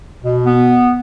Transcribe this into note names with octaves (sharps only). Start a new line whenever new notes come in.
B2
B3